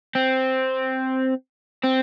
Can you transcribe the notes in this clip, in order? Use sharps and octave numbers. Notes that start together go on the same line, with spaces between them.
C4
C4